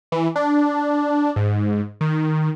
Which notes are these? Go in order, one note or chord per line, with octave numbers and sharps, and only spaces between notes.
E3
D4
G#2
D#3